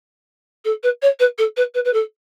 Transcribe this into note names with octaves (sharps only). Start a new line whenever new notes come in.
A4
B4
C#5
B4
A4
B4
B4
B4
A4